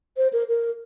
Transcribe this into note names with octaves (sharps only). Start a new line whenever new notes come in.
C5
A#4
A#4